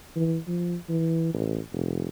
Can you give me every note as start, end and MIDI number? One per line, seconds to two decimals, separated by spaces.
0.16 0.38 52
0.47 0.76 53
0.89 1.30 52
1.34 1.59 33
1.72 2.07 29